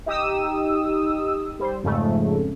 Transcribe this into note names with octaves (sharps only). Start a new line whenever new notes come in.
D#4 G4 D#6 E6
G3 C5
F2 G#2 C#3 A3